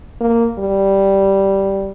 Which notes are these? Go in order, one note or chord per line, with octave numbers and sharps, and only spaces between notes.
A#3
G3